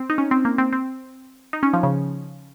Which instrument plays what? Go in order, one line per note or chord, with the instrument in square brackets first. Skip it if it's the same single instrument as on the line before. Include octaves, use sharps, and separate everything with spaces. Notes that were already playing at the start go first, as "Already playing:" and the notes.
Already playing: [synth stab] C4
D#4
C#4
C4
A#3
C4
C4
D#4
C#4
F3
C#3